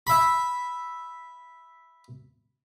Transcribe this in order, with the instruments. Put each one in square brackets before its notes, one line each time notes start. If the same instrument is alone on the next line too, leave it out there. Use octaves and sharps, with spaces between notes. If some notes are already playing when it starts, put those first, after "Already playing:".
[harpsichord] E5 B5